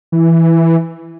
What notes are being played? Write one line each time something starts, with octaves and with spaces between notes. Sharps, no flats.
E3